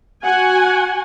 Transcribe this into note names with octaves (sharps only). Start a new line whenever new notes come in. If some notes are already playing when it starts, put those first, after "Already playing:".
F#4 F#5 G#5